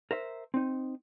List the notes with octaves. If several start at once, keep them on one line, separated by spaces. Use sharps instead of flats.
A#4 C5 E5
C4 D#4